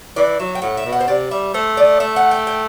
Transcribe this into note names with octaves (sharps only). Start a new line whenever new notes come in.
E3 D5
F#3 E5
G5
A2 F#5
E5
B2
F#5
C5
C3 D5
G3 E5
A3 C5
D5
A3 E5
F#5
G5
G5